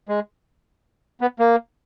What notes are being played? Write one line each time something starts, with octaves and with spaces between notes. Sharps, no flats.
G#3
B3
A#3